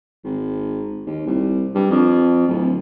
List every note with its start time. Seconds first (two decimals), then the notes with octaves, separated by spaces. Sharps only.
0.24 G#1
1.06 D#2
1.27 C2
1.75 G2
1.91 F2
2.48 D1